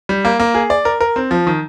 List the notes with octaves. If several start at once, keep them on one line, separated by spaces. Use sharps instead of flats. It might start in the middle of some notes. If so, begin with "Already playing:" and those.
G3
A#3
A#3
G#4
D5
A#4
A#4
C4
F3
D#3